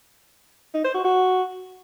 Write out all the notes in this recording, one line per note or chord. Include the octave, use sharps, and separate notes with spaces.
D#4
C5
F#4
F#4